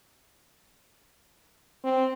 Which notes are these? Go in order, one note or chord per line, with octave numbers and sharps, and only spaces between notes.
C4